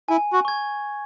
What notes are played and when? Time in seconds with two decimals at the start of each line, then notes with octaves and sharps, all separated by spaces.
0.08 E4 G#5
0.33 F#4
0.45 C#6 G#6